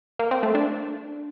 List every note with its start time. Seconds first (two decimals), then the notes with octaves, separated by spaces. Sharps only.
0.19 A#3
0.31 C4
0.43 A3
0.55 D4